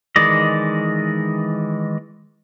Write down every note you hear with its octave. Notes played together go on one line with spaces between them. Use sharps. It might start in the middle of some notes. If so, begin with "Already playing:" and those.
D#3 E3 G#3 D5 D#5